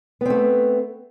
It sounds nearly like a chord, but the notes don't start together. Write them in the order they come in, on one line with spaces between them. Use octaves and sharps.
B3 C4 A3